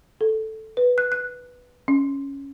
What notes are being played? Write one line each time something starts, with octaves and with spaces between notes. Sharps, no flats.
A4
B4
F#6
F#6
C#4